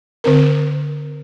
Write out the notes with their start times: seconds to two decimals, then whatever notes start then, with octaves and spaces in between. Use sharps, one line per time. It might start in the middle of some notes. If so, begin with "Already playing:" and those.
0.24 D3 C4 A#4